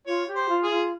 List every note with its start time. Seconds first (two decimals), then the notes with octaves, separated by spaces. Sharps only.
0.07 F4 C#5
0.28 G4
0.35 C5
0.49 F4
0.63 G#4
0.70 F4